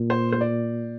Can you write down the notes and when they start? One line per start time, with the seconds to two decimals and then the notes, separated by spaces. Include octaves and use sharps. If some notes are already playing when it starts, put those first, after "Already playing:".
Already playing: A#2
0.10 C5
0.32 C5
0.41 D5